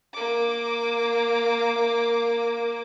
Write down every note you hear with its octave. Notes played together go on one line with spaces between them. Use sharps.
A#3 D6